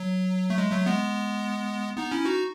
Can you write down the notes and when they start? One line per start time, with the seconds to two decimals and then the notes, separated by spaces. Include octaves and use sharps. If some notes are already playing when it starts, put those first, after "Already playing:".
Already playing: F#3
0.50 A3
0.58 G#3
0.72 F#3 A3
0.86 G#3 B3
1.98 B3 D#4
2.11 C#4 E4
2.26 D#4 F#4